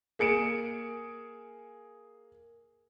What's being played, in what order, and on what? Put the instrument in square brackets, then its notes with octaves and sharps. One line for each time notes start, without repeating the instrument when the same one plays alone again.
[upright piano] A#3 G#4 C#7 D7 E7